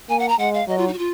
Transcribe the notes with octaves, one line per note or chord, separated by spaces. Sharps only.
A#3 G#5
F#5
A#5
G#3 F#5
F5
F#3 D#5
F4
D#4
F#4
F4